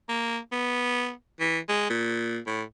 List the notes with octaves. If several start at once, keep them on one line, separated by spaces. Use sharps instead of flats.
A#3
B3
E3
G#3
A#2
A2